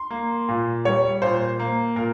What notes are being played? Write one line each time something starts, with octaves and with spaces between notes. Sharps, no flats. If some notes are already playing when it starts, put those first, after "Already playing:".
Already playing: C6
A#3
A#2
G3 C#5
A#2 C5
A#3
A#2 A#4